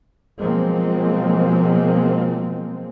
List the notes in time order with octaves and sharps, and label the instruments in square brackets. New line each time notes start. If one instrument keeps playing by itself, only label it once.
[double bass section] B2 F3 F#3 G#3 A#3 C4